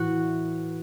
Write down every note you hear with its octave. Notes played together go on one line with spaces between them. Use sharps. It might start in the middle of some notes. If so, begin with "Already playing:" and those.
Already playing: A2 E3 F#4